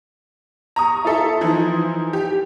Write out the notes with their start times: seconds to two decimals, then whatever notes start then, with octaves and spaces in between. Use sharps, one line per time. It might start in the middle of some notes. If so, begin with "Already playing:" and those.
0.76 A#5 C#6 D#6
1.05 E4 F4 A4 E5
1.41 E3 F3 D#4
2.13 G4